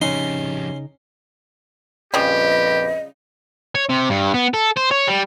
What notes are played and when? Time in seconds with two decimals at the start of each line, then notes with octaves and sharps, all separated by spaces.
0.02 F2 C#3 G3 C#4 D#4 C6
2.14 A#1 F2 C#3 F3 G3 G4 B4 D#5
3.75 C#5
3.89 C3
4.10 G2
4.34 B3
4.54 A4
4.77 C5
4.91 C#5
5.08 G3